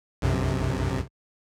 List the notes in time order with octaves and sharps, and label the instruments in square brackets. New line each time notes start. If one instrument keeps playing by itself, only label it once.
[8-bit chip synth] B1 F#2 C3